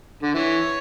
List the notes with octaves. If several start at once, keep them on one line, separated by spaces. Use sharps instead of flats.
D3
E3 C#5